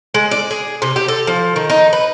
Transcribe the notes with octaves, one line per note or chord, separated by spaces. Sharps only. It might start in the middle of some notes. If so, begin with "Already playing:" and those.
G#3
D5
G#4
C3
G4
A4
F3
D#3
D#4
B4